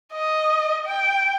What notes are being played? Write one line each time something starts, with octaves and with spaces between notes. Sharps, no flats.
D#5
G5